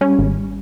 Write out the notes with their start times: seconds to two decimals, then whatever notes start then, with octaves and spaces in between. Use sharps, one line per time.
0.01 G3 C#4
0.19 G#1